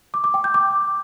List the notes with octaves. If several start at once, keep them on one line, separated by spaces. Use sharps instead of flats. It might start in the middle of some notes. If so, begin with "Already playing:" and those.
D6
D6
G5
G6
D6